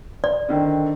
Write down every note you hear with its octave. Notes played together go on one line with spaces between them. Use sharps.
D5
D3 D#3 C4